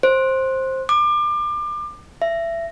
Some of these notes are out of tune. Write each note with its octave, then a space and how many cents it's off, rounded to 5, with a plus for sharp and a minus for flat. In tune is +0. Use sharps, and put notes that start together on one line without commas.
C5 +10
D6 +30
E5 +25